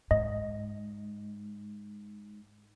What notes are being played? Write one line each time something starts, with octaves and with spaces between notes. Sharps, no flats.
G#2 D#5